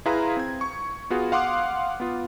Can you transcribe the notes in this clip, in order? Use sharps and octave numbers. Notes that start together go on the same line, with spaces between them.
E4 G#4 B4 F5 A#5 C6
C4 G#6
C#6
B3 F4 F#4 G#4
F5 F#5 C6 D6 D#6 F#6
B3 F4